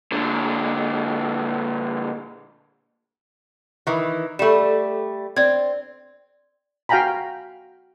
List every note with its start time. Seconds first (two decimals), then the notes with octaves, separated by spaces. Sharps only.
0.12 A#2 D3
3.87 D#3 E3
4.39 G3 A3 A4 E7
5.37 C4 D5 G#6
6.89 F#4 F5 G5 G#5 A#5 B5